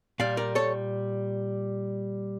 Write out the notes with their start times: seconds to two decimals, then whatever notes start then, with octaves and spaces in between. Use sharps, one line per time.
0.19 A#2 G3 D5 F5
0.37 A#4 D5
0.55 A4 C#5